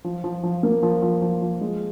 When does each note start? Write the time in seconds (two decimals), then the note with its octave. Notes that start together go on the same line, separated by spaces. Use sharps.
0.04 F3
0.24 F3
0.43 F3
0.63 A#3
0.83 F3
1.02 F3
1.22 F3
1.42 F3
1.61 G#3